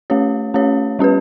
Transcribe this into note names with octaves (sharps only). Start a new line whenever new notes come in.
A3 C#4 G4 C#5
A3 C#4 G4 C#5
G3 C#4 G4 B4